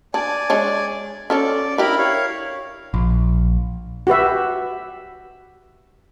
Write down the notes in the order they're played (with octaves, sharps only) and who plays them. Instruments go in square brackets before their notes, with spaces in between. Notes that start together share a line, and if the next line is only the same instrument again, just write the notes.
[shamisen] D4 [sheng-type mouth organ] D5 G#5
[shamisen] G#3 D4 C#5
[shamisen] C#4 A4 C#5 [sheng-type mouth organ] D5
[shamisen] D4 G4 [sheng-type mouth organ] E4 A#4 B5
[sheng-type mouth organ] C#5 F5
[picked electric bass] A#1
[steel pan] F#4 G4 B4 E5